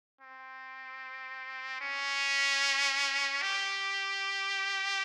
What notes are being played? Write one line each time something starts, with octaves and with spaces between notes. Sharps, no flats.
C4
C#4
G4